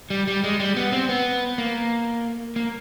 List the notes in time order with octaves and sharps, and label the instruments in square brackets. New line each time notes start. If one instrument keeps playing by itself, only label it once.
[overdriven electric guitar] G3
G3
G#3
G3
B3
C4
B3
A#3
A#3